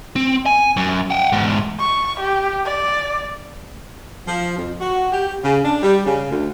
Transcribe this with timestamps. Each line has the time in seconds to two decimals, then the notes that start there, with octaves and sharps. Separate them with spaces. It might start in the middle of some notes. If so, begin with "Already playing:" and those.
0.16 C4
0.46 G#5
0.77 F#2
1.10 F#5 G5
1.32 E2 G#2
1.79 C#6
2.20 G4
2.65 D5
4.28 F3
4.58 F2
4.80 F#4
5.12 G4
5.43 C#3
5.65 D4
5.83 G3
6.05 C#3
6.30 D2